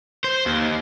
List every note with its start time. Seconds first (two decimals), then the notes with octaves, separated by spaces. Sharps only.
0.24 C5
0.46 D#2